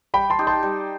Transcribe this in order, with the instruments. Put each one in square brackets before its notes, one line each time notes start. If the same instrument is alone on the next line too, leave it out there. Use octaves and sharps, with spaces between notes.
[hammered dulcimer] G3 [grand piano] G5 B5
[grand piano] A5 C6
[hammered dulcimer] D#4 G4
[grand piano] A5 C6
[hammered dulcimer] G3